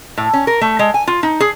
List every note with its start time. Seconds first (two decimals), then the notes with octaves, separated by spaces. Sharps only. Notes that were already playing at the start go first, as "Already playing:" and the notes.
0.17 A2
0.33 C#4
0.47 A#4
0.61 A3
0.79 G#3
0.94 G#5
1.07 F4
1.23 D#4
1.40 G#4